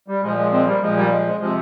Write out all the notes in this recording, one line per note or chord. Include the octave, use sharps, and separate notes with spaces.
G3
A#2 F3 G#3
G#3
G#3 C4
G3 A#3
A#2 F3 G#3
G3 A#3
G#3
G#3
C3 F3 G#3